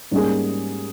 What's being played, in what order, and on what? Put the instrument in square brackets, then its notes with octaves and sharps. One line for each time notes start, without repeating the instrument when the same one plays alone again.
[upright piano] G#2 G3 A#3 C#4 G#4